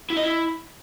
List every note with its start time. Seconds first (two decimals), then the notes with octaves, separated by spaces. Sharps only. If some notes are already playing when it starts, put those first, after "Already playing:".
0.10 E4
0.17 D#5
0.23 E4